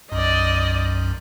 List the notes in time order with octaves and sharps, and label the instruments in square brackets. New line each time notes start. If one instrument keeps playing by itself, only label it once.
[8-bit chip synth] B1 F#2 [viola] D5 D#5